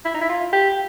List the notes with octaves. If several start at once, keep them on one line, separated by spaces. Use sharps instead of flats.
E4
D#4
E4
F4
G4